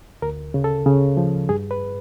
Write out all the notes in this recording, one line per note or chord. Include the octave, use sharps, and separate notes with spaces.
D2 A#4
C#3
A4
C#3
F3
G2 G#4
B4